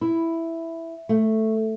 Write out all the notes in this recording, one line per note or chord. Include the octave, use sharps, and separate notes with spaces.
E4
A3